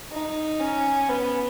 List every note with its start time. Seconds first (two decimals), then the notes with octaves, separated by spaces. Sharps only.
0.12 D#4
0.60 C#4
1.09 B3